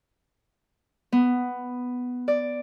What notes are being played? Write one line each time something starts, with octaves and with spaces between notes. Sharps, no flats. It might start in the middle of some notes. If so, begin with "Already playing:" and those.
B3
D5